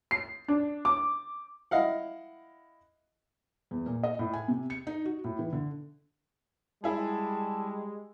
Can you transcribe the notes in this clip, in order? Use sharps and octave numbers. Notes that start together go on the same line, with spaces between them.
C7
D4
D6
E4 D#5 F5 F#5
E2
A#2
D#5
A2
G#5
C3
C#7
D#4
F#4
A2
E3
D3
G3 G#3 E4 G#4 A5